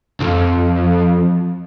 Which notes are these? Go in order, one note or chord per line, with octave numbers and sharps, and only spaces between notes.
B1 F2